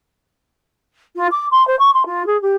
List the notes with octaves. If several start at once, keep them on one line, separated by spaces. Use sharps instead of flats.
F4
D6
C6
C5
C#6
C6
F4
G#4
G4